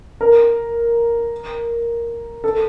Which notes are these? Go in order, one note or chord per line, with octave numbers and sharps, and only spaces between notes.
A#4
A4